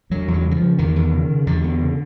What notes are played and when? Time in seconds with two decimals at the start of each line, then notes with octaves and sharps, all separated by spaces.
0.10 E2 F#3
0.28 E2
0.33 F#3
0.45 C#3
0.51 F#3
0.56 F3
0.62 C#3
0.78 E2 D#3
0.96 E2
1.12 C#3
1.30 C#3
1.46 E2 D3
1.64 E2
1.81 C#3